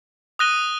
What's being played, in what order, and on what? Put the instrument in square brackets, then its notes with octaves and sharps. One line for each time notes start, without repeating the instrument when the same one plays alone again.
[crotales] D#6 F#6 A#6 D#7 G7